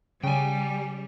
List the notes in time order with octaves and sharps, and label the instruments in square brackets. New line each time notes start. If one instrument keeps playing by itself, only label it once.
[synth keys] C#3 [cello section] G3 [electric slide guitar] G5 G#5